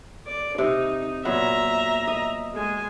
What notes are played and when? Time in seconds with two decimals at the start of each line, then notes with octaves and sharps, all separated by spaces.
0.27 D5
0.58 C3 D#4
1.25 A#2 F#3 B3 E5 A#5
2.07 D#5
2.54 G#3 G#5